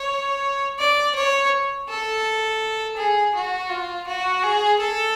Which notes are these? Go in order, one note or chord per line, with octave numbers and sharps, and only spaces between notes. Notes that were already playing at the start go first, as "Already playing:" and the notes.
Already playing: C#5
D5
C#5
A4
G#4
F#4
F4
F#4
G#4
A4